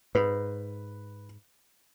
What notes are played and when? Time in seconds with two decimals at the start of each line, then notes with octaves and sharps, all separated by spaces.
0.15 G#2 B4